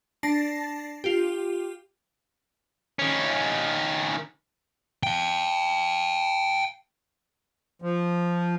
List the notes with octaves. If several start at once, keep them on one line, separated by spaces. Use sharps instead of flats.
D4 A5 A6 A#6 C7
F4 G4
D#3 C#4
F5 G5
F3